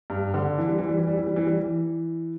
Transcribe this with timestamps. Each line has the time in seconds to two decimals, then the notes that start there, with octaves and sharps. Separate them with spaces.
0.10 G2
0.34 D3
0.58 E3
0.68 G3
0.78 E3
0.88 G3
0.97 E3
1.07 G3
1.17 E3
1.27 G3
1.36 E3
1.47 G3
1.56 E3